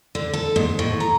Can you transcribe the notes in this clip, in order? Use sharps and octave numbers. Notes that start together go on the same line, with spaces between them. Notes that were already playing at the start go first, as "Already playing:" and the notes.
D3
A4
G#2
A2
A#5